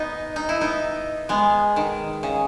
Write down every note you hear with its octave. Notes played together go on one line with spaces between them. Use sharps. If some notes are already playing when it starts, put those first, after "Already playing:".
Already playing: B3 D#4
D#4
E4
B3 D#4
G#3 B3
D#3
C#3